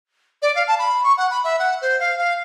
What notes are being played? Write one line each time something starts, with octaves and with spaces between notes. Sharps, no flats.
D5
F5
A5
B5
C#6
F#5
B5
E5
F#5
C5
F5
F5